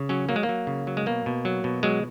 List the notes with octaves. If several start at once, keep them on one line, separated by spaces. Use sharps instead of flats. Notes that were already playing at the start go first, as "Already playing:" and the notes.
Already playing: C#3
F#3 C#4
F#3 A#3
G#3
A#3
F#3
C#3
F#3
G#3
B2 A#3
B2
F#3
B2
F#3 G#3